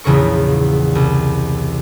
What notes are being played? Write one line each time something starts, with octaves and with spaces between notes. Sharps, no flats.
A#1 E2 C#3 A#4 C#6
C2